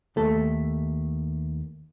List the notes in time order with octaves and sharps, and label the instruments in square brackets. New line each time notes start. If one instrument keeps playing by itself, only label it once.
[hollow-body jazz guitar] D#2 A3 A4